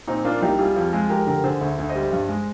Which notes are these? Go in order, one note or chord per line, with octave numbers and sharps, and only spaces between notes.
A#2 C4 D#4
A#3 D4 F4
C2 D#4 G4
G3 F4 G#4
F2 F4 G#4
G#3 F4 G#4
F1 G4 A#4
D3 G4 A#4
D3 G#4 C5
D2
D2
C5 D#5
G3
G2
G#3